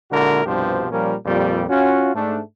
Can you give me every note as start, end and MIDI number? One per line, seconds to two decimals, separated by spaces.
0.11 0.45 46
0.11 0.45 50
0.11 0.45 56
0.11 0.45 64
0.11 0.45 66
0.11 0.45 70
0.46 0.86 36
0.46 0.86 43
0.46 0.86 47
0.46 0.86 53
0.46 0.86 67
0.46 0.86 72
0.92 1.14 46
0.92 1.14 53
0.92 1.14 55
0.92 1.14 61
0.92 1.14 70
1.26 1.64 41
1.26 1.64 46
1.26 1.64 55
1.69 2.14 61
1.69 2.14 65
1.69 2.14 66
2.14 2.40 44
2.14 2.40 57
2.14 2.40 62